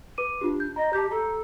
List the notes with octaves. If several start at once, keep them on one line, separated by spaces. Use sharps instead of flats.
B4 D6 D#7
D4 F4 G4
G6
D#5 A#5
G4 A5 G6
A4 A#5